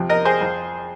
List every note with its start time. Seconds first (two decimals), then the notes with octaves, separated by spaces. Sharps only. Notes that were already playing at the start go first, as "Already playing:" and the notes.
Already playing: F2 C3 F3
0.09 A#4 D#5
0.25 G#4 C5
0.41 F2 F3